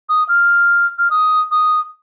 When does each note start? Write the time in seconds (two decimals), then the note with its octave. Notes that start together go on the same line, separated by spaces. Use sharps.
0.09 D#6
0.29 F6
0.98 F6
1.10 D#6
1.51 D#6